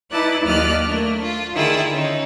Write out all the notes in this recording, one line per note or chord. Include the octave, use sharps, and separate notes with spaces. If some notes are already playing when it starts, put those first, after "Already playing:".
D#4 E4 B4 D5 A5 F#6
D#2 F#3 D5 D#5 F6 F#6
A3 A#3 D4
F4
D3 D#3 E4 F4 G#4
C#4 D#4